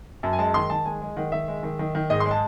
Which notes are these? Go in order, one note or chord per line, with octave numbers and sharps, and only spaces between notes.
F#2 A5
G#5
G#3 A5
D#3 C6
D#3 A5
G#3 G#5
G#3
D#3 F#5
D#3 E5
G#3
D#3
D#3
D#3
G#2 D#5
C6
G#3
A5